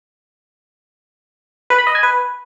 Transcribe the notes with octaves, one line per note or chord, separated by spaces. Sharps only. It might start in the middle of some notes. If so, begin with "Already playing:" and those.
B4
B5
D#5
G#5
B4